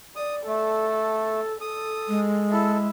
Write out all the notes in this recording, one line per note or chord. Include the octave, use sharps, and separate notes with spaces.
D5 D#6
A3 A4
A4 D#6
G#3
E4 A4